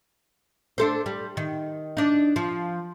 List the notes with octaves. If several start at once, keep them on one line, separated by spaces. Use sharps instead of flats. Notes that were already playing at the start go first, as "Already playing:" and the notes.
D4 A4 C5
G3
D#3
D4 D#4
F3